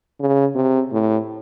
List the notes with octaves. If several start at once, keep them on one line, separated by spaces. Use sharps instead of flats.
C#3
C3
A2